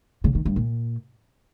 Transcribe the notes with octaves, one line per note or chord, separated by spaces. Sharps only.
C#3
D#3
G2
A#2